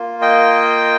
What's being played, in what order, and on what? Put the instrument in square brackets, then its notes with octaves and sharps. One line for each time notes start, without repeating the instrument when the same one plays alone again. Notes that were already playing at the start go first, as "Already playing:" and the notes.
Already playing: [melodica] A#3 F4
D#5 G5